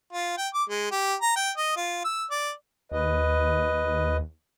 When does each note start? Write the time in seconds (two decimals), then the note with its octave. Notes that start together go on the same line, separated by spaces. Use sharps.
0.13 F4
0.38 G5
0.54 D6
0.70 G#3
0.92 G4
1.22 A#5
1.36 G5
1.57 D#5
1.77 F4
2.05 E6
2.31 D5
2.92 D#2 B4 D#5